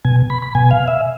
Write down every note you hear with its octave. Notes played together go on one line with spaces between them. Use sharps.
B2 G#5
B5
B5
B2 G#5
F5
E5